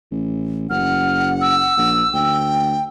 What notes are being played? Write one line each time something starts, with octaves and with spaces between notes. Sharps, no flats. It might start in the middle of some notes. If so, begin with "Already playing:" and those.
A1
F#1 F#5 F6
E6
A#1
D2 G5